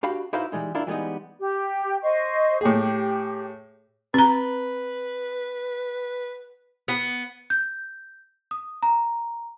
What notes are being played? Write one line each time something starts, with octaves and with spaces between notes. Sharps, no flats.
D4 F#4 G4 F5 G5 B5
D#4 E4 F#4 B4 C5 F5
E3 G3 G#3 D#4
D4 E4 F4 A#4
E3 G3 G#3 B3 D#4
G4
C5 D#5 C#6
A2 G4 G#4
C4 B4 A#5
B3
G6
D#6
A#5